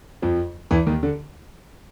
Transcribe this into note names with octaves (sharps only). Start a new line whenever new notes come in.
F2 F3
E2 E3
D#2 D#3
D3